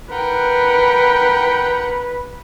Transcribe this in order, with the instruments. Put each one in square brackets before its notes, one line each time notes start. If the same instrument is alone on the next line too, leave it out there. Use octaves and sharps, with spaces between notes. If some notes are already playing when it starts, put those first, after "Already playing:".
[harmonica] A#4 F#5 G5 [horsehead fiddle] B4